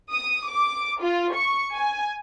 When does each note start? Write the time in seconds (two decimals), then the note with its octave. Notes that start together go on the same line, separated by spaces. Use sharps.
0.12 D#6
0.47 D6
1.01 F4
1.34 C#6
1.74 G#5